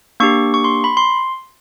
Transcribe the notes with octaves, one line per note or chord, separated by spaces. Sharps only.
A#3 D4 G4 C#6
C#6
C6
B5
C6